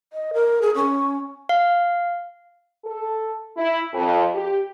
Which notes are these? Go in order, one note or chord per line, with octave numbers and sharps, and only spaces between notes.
D#5
A#4
G#4
C#4
F5
A4
E4
F2
G4